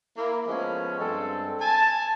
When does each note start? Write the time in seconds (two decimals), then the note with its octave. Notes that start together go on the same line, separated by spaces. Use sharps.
0.17 A#3 E4
0.47 F3 G#3 A3 B3 C#4
1.00 G2 G#3 C4 A4
1.61 G#5 A5